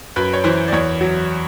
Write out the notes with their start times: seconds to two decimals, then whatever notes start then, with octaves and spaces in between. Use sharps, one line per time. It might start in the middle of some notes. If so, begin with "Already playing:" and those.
0.16 F#2 B4
0.33 C#5
0.44 E3 C5
0.68 D5
0.72 E2 C#5
1.01 F#3